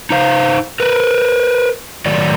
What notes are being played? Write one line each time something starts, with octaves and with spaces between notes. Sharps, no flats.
D#4 C5 F5
A#4 B4
A2 D#3 F#3 D5